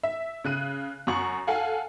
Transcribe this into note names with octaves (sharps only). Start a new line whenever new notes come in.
E5
C#3 F#6 D#7
F#2 F#4 C#6 F#7
A4 F5 F#5 G#5